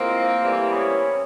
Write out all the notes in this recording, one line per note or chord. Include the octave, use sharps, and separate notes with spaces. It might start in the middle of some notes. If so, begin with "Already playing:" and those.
Already playing: A2 F3 G#3 A#3 C4
A2 E3 G3
B3 C#4